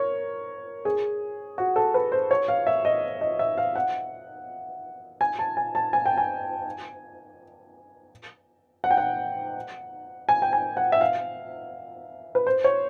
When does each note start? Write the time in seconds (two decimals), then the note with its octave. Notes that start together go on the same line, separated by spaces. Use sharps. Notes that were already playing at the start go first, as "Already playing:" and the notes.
Already playing: A#4 C#5
0.85 G#4
1.58 F#4
1.76 A4
1.94 B4
2.12 C5
2.31 C#5
2.48 F5
2.67 E5
2.85 D#5
3.21 D#5
3.39 E5
3.58 F5
3.76 F#5
5.21 G#5
5.39 A5
5.57 G#5
5.75 A5
5.93 G#5
6.06 G5
6.18 G#5
8.84 F#5
8.91 G5
8.97 F#5
10.29 G#5
10.42 G5
10.53 G#5
10.77 F#5
10.92 E5
11.01 F5
12.35 B4
12.47 C5
12.64 C#5